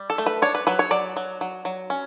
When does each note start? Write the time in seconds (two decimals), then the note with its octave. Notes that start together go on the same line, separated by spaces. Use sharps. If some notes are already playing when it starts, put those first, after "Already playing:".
Already playing: G3
0.10 A4
0.18 A3
0.26 B4
0.42 D4 C#5
0.55 B4
0.67 F#3 B4
0.79 C#5
0.91 F#3 D5
1.17 F#3
1.41 F#3
1.65 F#3
1.90 C#4